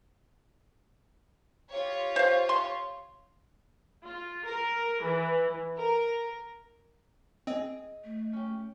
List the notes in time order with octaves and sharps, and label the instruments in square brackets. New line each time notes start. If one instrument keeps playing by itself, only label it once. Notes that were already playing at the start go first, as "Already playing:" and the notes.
[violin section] F4 G4 C#5
[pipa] C5 F5
C6
[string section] F4
A#4
E3
A#4
[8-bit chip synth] C4 [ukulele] G#4 D#5
[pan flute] A3
[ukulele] C#4 G4